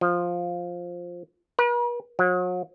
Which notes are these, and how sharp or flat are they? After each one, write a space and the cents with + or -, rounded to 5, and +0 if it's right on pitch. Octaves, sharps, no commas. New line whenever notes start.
F3 +5
B4 -45
F#3 -40